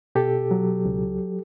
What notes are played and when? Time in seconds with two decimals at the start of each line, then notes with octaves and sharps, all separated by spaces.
0.15 B2 G4 A4
0.51 F#3
0.85 C#2